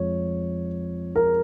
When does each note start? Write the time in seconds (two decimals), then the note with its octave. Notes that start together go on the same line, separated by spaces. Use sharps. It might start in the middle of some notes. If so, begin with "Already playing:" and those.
Already playing: F2 F3 G#3 C#5
1.15 A#4